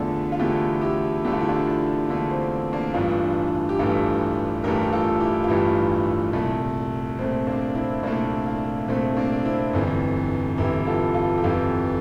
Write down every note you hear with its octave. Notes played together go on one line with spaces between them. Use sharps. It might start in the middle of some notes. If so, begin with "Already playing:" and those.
Already playing: E2 D3 A3 D4 F4
F4
E2 D3 A3 E4 G4
E4 G4
E2 D3 A3 G4
F4
E4
D4 F4
E2 D3 A3 A#3
C4
A#3 D4
A1 G2 E3 A3 D4 F4
G4
A1 G2 E3 A3 F4 A4
A1 G2 E3 A3 G4 A#4
G4
F4 A4
E4 G4
F4
A1 G2 E3 A3 E4 G4
C2 A#2 A3
C2 A#2 A3 C4
A#3 D4
C4 E4
C2 A#2 A3 A#3 D4
A#3
C2 A#2 A3 C4
A#3 D4
C4 E4
G1 F2 E3
G1 F2 E3 E4 G4
F4 A4
F4 A4
G4
G1 F2 E3 F4 A4